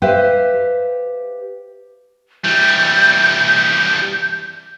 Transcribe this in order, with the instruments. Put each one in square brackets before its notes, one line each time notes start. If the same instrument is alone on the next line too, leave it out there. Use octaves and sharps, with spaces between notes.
[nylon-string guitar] G4 B4 C5 E5 F5 G5
[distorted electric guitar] E3 G3 [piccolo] G6